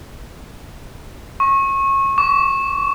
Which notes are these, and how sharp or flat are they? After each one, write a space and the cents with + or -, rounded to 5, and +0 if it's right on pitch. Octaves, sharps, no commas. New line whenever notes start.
C#6 -25
C#6 +40